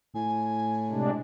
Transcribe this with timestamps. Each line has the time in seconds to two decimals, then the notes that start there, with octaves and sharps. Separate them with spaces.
0.15 A2 G#5
0.91 C3 G#3 D4